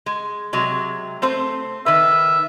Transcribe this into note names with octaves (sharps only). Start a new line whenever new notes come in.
G#3
C3 F#3 G#3
A3 C4 C5
D#3 B4 E5